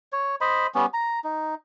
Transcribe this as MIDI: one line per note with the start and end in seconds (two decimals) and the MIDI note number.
0.12 0.36 73
0.41 0.67 72
0.41 0.67 75
0.41 0.67 83
0.75 0.86 55
0.75 0.86 59
0.75 0.86 61
0.94 1.19 82
1.24 1.55 63